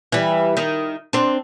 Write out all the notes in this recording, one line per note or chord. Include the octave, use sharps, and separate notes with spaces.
E3 G3
D#3 D#4
C4 D4